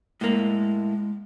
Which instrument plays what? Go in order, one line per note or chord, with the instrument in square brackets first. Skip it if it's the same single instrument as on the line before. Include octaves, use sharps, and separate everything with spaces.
[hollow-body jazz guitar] A2 A#3 [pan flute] G#3